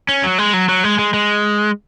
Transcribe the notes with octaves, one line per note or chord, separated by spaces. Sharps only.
C#4
F#3
G#3
F#3
F#3
G#3
G#3
G#3